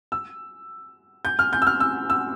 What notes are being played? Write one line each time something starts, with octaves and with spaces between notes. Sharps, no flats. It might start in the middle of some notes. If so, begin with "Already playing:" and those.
E6
G6
F6
G6
E6
F6
E6
E6